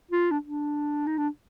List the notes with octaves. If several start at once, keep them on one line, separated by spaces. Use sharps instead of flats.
F4
D4
D4
D#4
D4